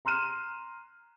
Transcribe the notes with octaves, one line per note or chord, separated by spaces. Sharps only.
A#5 C6 F6 F#6 D#7 E7